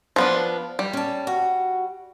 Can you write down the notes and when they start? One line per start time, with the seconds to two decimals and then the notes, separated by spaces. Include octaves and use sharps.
0.16 F3 B3 D4 F5
0.79 G3
0.93 C#4 A5
1.27 F#4